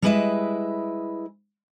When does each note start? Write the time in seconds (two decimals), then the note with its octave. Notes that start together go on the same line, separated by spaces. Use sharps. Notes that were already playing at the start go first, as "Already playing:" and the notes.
0.02 G3 G#3 E4 B4 D#5 E5